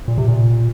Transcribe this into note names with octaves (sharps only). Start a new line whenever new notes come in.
A#2
C3
A#2